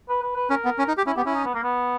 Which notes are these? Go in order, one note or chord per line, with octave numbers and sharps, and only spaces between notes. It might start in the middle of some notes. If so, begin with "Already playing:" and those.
B4
B4
B4
C#4 A#4
B3
C#4
D#4
G4
C#4 E4
B3 G4
C#4 E4
D#4
B3
A#3
B3